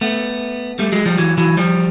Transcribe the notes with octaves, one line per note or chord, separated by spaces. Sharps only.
A3 B3
G3 A3
F#3 G#3
F3 G3
E3 F#3
E3 F#3
F3 G3